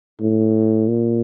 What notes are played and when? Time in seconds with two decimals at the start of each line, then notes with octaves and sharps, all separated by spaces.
0.21 A2
0.88 A#2